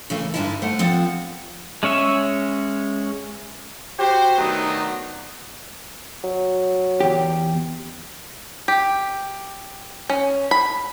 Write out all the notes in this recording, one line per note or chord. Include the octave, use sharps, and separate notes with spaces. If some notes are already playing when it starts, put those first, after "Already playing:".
C#3 E3 A3 A#3
G2 D3 G#3 D#4 E4 A5
A3 C5 F#5
F3 C4 A4 F#5
G#3 C#4 C#5 E5
F#4 G4 C5
D#3 F#3 A3 B3 D4 D#4
F#3
E2 G4
G4
C#4
B5